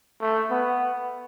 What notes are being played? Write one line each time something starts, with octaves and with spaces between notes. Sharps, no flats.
A3
B3